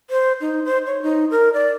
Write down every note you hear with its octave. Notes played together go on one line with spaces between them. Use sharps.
C5
D#4
C5
C#5
D#4
A#4
D5